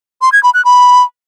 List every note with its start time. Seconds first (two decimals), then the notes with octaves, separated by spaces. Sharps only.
0.21 C6
0.32 G#6
0.43 B5
0.54 F#6
0.65 B5